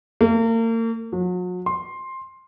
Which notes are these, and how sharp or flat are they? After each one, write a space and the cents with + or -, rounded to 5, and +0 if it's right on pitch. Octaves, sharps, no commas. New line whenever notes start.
A#3 -40
F#3 -40
C6 +10